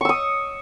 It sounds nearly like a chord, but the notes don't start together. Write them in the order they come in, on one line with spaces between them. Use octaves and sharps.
C#6 E6 D#6